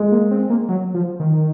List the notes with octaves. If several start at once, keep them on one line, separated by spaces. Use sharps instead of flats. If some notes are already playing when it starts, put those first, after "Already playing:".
Already playing: G#3
A#3
C4
A#3
F#3
F3
D#3